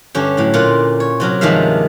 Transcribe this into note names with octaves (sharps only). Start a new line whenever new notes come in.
G2 D3 C#4 G4
A2 F#3
A#2 F4 A#4 F#5
C#5
C3 F#3 A#4
G2 D#3 F3 G#3 E5 F5